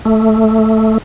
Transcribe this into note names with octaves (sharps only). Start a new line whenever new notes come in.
A3